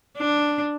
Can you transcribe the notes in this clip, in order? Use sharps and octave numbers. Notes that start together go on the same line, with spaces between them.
D4